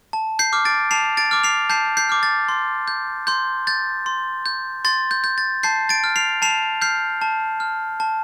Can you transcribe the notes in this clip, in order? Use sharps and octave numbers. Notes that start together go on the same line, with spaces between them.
A5
G6 C7
D6 F6
A6 D7
A5 C7 F7
A6 D7
D6 F6
C7 F7
A5 G6 C7
G6 C7
D6 F6
A6
C6
G6
C6 G6
G6 A6
C6
G6
C6 A6
G6
G6
A6
A5 G6 C7
A6 D7
F6
C7 F7
A5 C7 F7
F6 G6 C7
A5
F6
A5